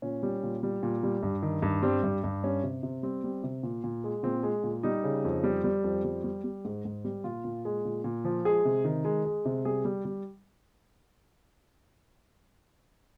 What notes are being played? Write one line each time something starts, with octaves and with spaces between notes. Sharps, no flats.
A#2 C#4
G3
A#2
G3
A#2
G3
G2
D#3
G2
G3 C4
G2
G2
G3 C#4
C3
C3
G3 C4
G3
C3
A#2
A#2
G#3
A#2 C4
G#3
A#2
G3 D#4
C#3
F2
G3
G3
F2
G3
G3
G3
G#2
G#2
G3
A#2 F4
A#2
G#3
A#2
A#2
F3
G#3 G#4
C3
D#3
G#3
G#3
C3
G3 G#4
G3
G3